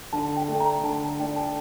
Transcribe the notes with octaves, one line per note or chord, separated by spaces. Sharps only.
D3 A5
G5
A3 D4
A#5
D3 A5
A5
A3 D4 G5
A5